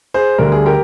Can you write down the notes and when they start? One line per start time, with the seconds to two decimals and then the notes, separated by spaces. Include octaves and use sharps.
0.14 G#4 C5
0.38 D2 D3 G3 D4 A#4
0.52 G#4
0.66 G4 A#4